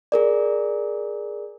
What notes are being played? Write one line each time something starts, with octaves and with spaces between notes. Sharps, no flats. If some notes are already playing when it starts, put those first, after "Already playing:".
G#4 A#4 D5